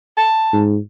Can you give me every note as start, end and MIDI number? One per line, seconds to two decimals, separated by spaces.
0.17 0.61 81
0.53 0.77 44